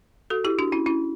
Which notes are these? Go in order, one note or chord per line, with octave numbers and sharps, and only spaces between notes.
F#4 A4
E4 G4
D4 F#4
C#4 E4
C#4 E4